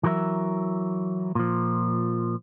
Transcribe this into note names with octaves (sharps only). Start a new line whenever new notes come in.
E3 F#3 A#4 C5 E5
A#2 F3